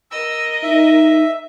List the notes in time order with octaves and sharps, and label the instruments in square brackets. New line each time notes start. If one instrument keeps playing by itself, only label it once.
[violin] A#4 D#5 [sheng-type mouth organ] E6
[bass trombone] D#4 [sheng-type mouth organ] E5